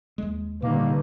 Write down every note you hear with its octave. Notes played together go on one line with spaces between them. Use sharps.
D#2 G#3
A#2 D3 D#3 G3 A#3 B4